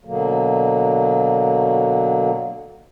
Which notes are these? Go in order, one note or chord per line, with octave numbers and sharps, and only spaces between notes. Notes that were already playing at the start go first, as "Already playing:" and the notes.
B2 D3 F#3 A#3